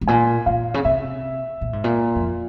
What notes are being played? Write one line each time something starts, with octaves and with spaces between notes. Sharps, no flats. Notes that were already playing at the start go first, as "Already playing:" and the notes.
G#2
A#2 G#5
A#2 F5
C#3
C3 E5
A#2
G#2
A#2
F2